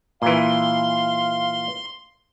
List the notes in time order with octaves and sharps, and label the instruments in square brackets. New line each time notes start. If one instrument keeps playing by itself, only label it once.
[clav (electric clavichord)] A#2 E3 [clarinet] F5 [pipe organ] C6